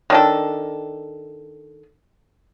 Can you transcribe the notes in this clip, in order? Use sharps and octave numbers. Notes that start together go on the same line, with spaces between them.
D#3 D4 A4